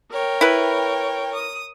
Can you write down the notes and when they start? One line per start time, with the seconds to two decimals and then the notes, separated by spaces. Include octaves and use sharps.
0.11 A#4 C#5 G5
0.41 E4 B4
1.34 D#6